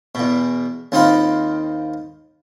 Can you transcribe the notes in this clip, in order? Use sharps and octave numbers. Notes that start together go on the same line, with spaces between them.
E2 B2
D#2 C4 D#4 F4 B5